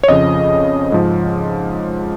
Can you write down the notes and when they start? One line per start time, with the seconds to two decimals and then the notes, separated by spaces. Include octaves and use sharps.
0.03 C#5
0.08 F2 C#3 F3 D#5
0.92 G#2 F3